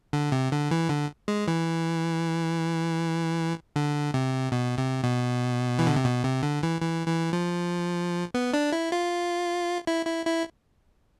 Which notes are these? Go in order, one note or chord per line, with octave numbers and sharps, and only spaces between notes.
D3
C3
D3
E3
D3
G#3
E3
D3
C3
B2
C3
B2
E3
D3
C3
B2
C3
D3
E3
E3
E3
F3
B3
D4
E4
F4
E4
E4
E4